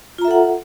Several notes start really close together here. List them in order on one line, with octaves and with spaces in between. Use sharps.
F4 A#5 E5 A4 F#5